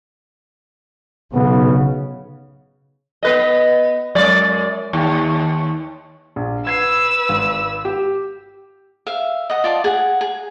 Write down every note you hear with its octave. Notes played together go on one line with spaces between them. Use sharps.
B1 C#3 B3
B3 B4 D#5
F#2 G#3 D5
D#2
A#1
B4 E6 G#6 C7
G#1
G4
E5 F5
D#5 F#5
F4 D5 A5
G#4 F#5
G#4